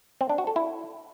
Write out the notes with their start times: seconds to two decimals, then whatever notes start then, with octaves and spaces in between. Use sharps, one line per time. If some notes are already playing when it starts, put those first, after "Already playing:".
0.21 C4
0.29 D4
0.38 F#4
0.47 A4
0.56 E4